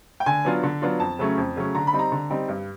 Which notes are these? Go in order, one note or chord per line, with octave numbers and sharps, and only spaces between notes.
G5
D3 G#5
F#3 B3 D4 F4
D3
F#3 B3 D4 F4
F2 A5
C#3 F#3 A3 C#4
F2
C#3 F#3 A3 C#4
D3 A#5
B5
G3 C4 D#4
A#5
D3
G3 C4 D#4
G2